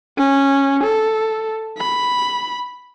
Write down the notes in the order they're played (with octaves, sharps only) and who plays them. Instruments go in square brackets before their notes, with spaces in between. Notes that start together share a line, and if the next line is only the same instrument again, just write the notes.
[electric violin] C#4
A4
B5